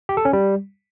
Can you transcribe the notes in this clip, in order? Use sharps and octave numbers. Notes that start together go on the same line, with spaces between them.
G4
A4
C#4
G3